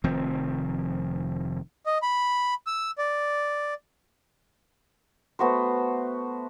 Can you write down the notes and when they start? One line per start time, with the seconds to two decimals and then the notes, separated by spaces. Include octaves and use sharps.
0.04 F1 D#3 F3 C4
1.86 D#5
2.02 B5
2.67 E6
2.98 D5
5.39 A3 B3 F#4 C5